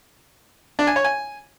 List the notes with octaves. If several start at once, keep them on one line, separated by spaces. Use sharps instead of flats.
D4
G#5
C#5
G#5